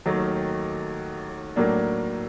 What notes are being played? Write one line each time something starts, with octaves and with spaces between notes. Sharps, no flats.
D#2 D#3 F#3 A3
A2 F#3 A#3 D4